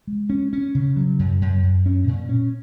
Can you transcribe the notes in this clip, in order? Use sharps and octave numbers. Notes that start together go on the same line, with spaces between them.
G#3
C#4
C#4
C#3
F#3
F#2
F#2
F#2
C#4
A#2
C#4